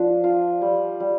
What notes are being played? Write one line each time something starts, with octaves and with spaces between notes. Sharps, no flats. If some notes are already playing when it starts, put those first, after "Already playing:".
Already playing: F3 D4
F4
G3
G3